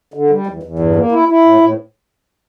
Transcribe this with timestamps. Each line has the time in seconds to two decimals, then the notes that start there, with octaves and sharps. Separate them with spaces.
0.14 D3
0.30 G3
0.47 E2
0.63 E2
0.79 G2
0.96 A#3
1.12 E4
1.29 E4
1.45 A2
1.61 A2